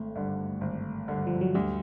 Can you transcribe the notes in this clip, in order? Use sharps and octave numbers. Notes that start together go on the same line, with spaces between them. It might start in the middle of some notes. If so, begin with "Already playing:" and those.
Already playing: G#1 A3
G2 D3
G#1
G2 D3
F3
F#3
D2 G3